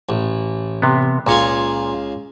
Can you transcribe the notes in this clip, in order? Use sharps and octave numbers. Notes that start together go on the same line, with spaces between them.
A1
C3 B3
C#2 A#2 F4 G#4 C#5